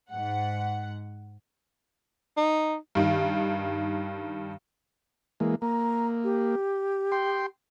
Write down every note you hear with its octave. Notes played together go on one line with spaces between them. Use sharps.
G#2 F#5
D#4
G2 D#3
E3 G#3 A#3
A#3 A#5
G4
G5 C6